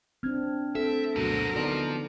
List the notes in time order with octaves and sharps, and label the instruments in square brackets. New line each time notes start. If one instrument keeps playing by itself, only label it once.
[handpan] C4 D4 [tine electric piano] F6 G#6
[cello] C4 [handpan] A4 [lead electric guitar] E5
[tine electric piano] D2 G2 B2 [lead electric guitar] D3 C4 [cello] F#3 A#4
[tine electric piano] D3 B3 [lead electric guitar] F3 [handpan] D#4 D5